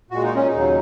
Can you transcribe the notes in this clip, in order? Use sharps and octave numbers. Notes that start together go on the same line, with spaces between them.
A#2 G#3 F#4
D#4
C#4
D#4
D#2 C#3 F#3